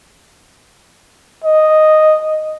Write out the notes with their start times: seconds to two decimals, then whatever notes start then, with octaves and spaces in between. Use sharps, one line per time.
1.45 D#5